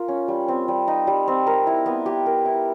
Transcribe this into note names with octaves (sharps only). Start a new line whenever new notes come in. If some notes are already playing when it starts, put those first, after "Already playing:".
Already playing: F4 A#4
C#4
G3
C4
G3
D#4
G3
C4
A#4
E4
B3
G4
A#4
E4